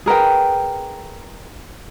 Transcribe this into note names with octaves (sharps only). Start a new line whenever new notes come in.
G#4 A#4 B4 G5